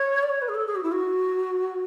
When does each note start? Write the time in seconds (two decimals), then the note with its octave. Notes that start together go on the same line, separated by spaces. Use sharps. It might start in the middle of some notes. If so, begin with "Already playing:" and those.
Already playing: C#5
0.23 D5
0.29 C#5
0.41 B4
0.48 G#4
0.54 A4
0.67 G#4
0.75 F#4
0.83 E4
0.92 F#4